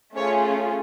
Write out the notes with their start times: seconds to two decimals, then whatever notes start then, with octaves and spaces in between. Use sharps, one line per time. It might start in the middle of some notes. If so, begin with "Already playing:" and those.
0.16 A3 C#4 F4 G#4 C#5